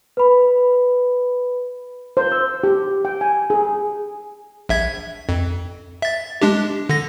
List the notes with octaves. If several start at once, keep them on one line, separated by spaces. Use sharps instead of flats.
B4 B5
C5
E6
G4
G5
G#5
G#4
A#1 E5 G#6
F2
E5 A6
G#3 D4 G4
D3 A#6